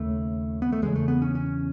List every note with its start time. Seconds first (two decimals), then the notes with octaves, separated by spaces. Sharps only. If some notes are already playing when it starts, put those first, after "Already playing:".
Already playing: D#2 C#3 A3
0.62 B3
0.72 A3
0.82 E2 C#3 G#3
0.96 A3
1.08 B3
1.22 C#4
1.35 C#4